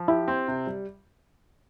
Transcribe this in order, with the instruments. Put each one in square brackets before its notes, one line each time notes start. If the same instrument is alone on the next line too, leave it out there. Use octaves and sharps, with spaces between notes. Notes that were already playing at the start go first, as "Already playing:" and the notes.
Already playing: [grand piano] F3
[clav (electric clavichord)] E4 [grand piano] G4
[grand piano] C4
C3
G3